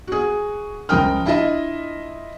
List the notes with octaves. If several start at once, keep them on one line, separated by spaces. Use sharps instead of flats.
F#4 G#4
C#2 F3 A#4 G5 D#6 F6
D4 E4 F4 D#5 E5